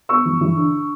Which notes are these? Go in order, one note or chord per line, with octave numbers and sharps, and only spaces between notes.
B3 C#6 E6
E3
E3
D3
D3